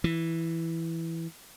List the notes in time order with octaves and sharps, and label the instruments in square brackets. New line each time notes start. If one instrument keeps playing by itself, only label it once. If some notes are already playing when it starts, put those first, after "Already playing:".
[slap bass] E3